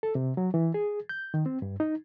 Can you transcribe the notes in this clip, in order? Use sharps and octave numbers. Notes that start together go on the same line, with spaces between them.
A4
C3
F#3
E3
G#4
G6
D#3
C4
G2
D#4